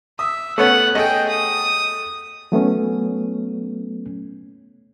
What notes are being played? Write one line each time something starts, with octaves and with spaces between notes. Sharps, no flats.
E5 D#6
A3 B3 C#4 F#5
A3 G#4 D#5 G5
D#6
F#3 A3 B3 C#4